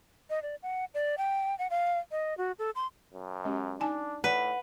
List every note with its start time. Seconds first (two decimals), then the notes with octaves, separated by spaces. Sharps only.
0.30 D#5
0.43 D5
0.63 F#5
0.94 D5
1.18 G5
1.59 F#5
1.70 F5
2.11 D#5
2.38 F#4
2.59 A4
2.75 C6
3.13 F#2
3.45 G#3 C#4 G4
3.80 D4 D#4 G#5 A5
4.24 A2 B4 D5 F#5